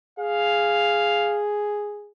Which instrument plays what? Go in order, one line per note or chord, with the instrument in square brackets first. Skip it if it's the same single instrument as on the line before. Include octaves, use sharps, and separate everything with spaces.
[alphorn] G#4 [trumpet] F5